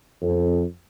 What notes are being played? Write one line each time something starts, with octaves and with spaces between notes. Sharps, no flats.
F2